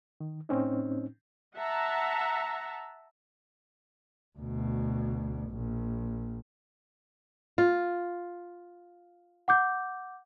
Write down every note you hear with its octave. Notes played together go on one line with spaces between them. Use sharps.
D#3
A2 C4 C#4 D#4
E5 F#5 A5 A#5
D2 B2
A#1
F4
F#5 D6 G6